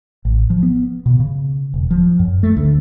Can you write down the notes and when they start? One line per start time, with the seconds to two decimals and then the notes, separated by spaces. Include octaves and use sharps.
0.25 A1
0.50 F3
0.63 B3
1.06 B2
1.20 C#3
1.74 E1
1.91 F3
2.19 F#2
2.43 A3
2.57 D2